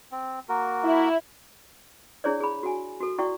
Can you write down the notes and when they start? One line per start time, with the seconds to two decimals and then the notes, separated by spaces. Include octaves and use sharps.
0.12 C4
0.49 A#3 F#4 A#4
0.83 E4
2.24 D4 E4 G#4 C#5 D5
2.40 G#4 B5
2.63 F#4 G#5
3.01 F#4 A4
3.18 E4 F#4 D5 G5 C#6